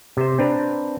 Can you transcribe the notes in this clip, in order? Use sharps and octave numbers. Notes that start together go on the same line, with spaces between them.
C3 C5
C4 D4 B4 A#5